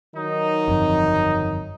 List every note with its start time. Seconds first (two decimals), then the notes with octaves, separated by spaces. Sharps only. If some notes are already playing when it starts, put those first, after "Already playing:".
0.15 D#3 F#3 D#4
0.68 G1 F2